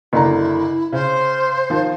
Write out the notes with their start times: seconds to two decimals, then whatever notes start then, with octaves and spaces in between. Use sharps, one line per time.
0.13 F#1 D3 E4 A#5
0.93 C#3 C5
1.70 D#3 F3